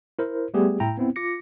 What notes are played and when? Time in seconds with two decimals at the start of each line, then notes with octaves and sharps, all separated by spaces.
0.19 E4 A#4 C5
0.54 G3 A3 B3 G4 G#4
0.80 A2 E4 G5 A#5
0.98 B3 C4 E4
1.16 F4 D6 A#6 C#7